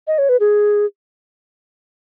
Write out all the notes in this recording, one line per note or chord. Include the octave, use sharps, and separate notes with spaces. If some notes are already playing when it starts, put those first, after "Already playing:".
D#5
C#5
B4
G#4